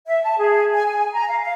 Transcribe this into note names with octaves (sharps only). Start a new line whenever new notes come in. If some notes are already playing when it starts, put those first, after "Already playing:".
E5
A5
G#4
G#5
G#5
A#5
F5
F5